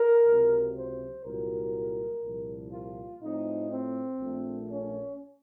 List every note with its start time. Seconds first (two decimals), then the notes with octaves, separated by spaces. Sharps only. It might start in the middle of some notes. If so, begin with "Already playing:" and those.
Already playing: A#4
0.27 C#2 C3 F#3
0.77 C5
1.25 C2 A#2 F#3 A#4
2.24 C2 A#2 F3
2.73 F4
3.22 A2 F3 A3 C4 D#4
3.72 C4
4.21 A#1 A#2 A3
4.69 C#4